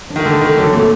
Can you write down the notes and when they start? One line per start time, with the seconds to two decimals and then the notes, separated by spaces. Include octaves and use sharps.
0.10 D4
0.16 D#3
0.25 D3 A3
0.41 D#3 A3
0.57 D3 F#3
0.73 A#2 A3